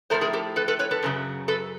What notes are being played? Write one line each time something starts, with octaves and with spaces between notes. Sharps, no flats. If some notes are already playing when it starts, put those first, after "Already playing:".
A2 F3 A3 A#4 C5
G#4 A#4
G4 A4
A4 B4
A4 B4
B4 C#5
A4 B4
F#2 C#3 F#3
A4 B4